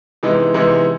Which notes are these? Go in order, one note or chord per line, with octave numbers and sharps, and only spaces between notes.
C3 E3 G#3 B3 D#4
C3 E3 G#3 B3 D#4